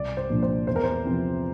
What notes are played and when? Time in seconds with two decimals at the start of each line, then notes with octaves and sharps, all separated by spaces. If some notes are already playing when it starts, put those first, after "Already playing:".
Already playing: C2 D5
0.17 C5
0.30 A#2 F3 A#3 D4
0.42 C5
0.67 E2 C5
0.76 A#4
0.84 C5
1.05 C3 F3 C4